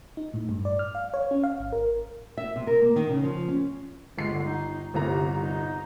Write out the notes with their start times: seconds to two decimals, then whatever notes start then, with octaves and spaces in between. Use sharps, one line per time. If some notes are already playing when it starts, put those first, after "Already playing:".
0.17 D#4
0.34 A2
0.49 G2
0.65 D5
0.79 F6
0.95 F5
1.14 C#5
1.31 C#4
1.44 F5
1.60 G#1
1.72 A#4
2.37 E5
2.56 C3
2.67 A#4
2.81 A#3
2.96 D#3
3.10 C#3
3.23 F3
3.48 C#4
4.17 G1 G#3 C7
4.33 D3
4.45 D#4
4.94 G1 C2 C3 A#5
5.37 D#4